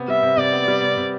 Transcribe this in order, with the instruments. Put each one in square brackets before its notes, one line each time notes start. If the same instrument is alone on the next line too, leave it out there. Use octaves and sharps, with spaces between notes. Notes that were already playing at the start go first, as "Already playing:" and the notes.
Already playing: [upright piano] C3 B3
[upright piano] G3 [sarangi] E5
[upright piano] C3
[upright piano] C3 [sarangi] D5
[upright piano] B3
G3
C3
C3